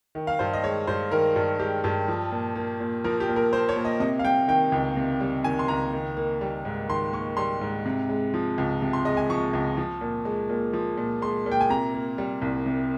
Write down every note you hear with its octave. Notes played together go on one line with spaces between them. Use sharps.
D#3
F5
G2 C5
D#5
G#3 C#5
G2 C5
D#3 A#4
G2
G#3 G4
G2 G4
F3
A#2
A#3
A#2
F3 A#4
G4
A#2
A#4
A#3 C5
C#5
A#2
D#5
C3 D#5
F5
G3 G5
D#3 G5
C#2
C3
G3
D#3 G#5
C6
C#2 A#5
D#3
A#3
G3
G#2
D#3 C6
A#3 C#6
G3 C6
G#2
C3
G#3
F3
C#2
C3
C6
G#3 D#5
G#5
F3 C#6
C#2
F3
A#2
G#3
A#2
F3
A#2
G#3 C6
A#2
G5
G#5
C3 A#5
A#3
G3
C2
C3